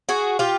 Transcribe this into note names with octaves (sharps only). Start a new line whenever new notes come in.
F#4 G#4
F4 G4